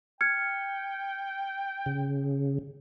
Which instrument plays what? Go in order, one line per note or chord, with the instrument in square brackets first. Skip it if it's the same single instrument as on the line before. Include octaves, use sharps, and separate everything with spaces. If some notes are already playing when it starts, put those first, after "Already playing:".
[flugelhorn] G5 [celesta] F6 G#6 C#7
[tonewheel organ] C#3